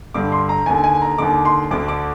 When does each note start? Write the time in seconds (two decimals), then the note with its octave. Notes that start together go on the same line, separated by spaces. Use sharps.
0.14 G2 D3 D6
0.32 C6
0.49 A#5
0.66 D#2 D3 G#5
0.84 G#5
1.02 A#5
1.18 D#2 D3 D6
1.45 C6
1.71 D2 D3 D6
1.88 D6